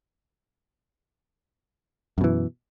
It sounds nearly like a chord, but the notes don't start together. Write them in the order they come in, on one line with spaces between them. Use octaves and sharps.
F#2 B2 E3